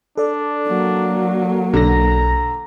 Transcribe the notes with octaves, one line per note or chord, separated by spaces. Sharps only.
D4 A4 D5
F#3 A#3
B1 D3 A#5 A#6